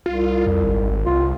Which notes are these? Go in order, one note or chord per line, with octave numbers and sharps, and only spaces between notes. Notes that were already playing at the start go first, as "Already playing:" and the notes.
C2 F4
F2
G#1
C2 F4